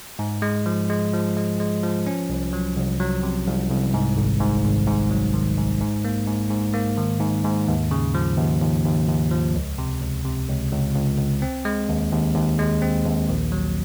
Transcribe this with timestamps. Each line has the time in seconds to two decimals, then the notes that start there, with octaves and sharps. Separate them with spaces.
0.19 G#2
0.42 G#3
0.66 F3
0.90 G#3
1.13 F3
1.37 G#3
1.60 G#3
1.83 F3
2.07 C#4
2.29 C2
2.53 F#3
2.76 C2
3.00 F#3
3.23 C3
3.46 C2
3.70 C2
3.94 G#2
4.17 G#1
4.40 G#2
4.64 G#1
4.87 G#2
5.10 F#3
5.34 D#3
5.57 G#2
5.81 G#2
6.05 A#3
6.27 G#2
6.50 G#2
6.74 A#3
6.98 D#3
7.20 G#2
7.44 G#2
7.68 D#2
7.91 C#3
8.14 F3
8.38 D#2
8.62 D#2
8.85 D#2
9.08 D#2
9.31 F3
9.55 C#2
9.78 C3
10.02 C#2
10.25 C3
10.48 C#2
10.72 C#2
10.95 C#2
11.18 C#2
11.42 C4
11.65 G#3
11.89 D#2
12.12 D#2
12.35 D#2
12.59 G#3
12.82 C4
13.05 D#2
13.29 A#1
13.52 F#3